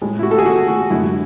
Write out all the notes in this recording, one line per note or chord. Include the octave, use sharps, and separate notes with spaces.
A2 G#3
E4
F#4
A4
G#4
F#4
F#4
F#2 D3 G#3 E4